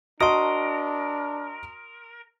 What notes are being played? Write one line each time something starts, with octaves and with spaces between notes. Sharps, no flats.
D4 F#4 A#4 D#5 A5 C6 D#6